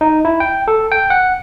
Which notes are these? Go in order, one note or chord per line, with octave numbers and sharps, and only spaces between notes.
D#4
E4
G5
A4
G5
F#5